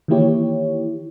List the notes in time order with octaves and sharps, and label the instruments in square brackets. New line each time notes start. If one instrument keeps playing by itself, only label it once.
[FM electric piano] D#3 E3 A#3 E4 G4 C#5